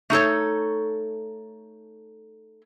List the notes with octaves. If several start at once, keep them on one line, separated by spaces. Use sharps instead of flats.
A3 D#4 A4 C#5